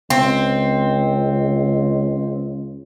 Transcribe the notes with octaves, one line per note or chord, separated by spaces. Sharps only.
C#2 C4